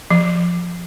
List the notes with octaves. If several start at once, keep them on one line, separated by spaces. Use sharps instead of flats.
F3